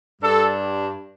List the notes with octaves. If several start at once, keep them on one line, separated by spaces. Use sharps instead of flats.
G2 G3 D4 A4